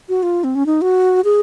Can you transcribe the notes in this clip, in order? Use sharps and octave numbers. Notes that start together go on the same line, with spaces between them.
F#4
F4
C4
C#4
D#4
F#4
G#4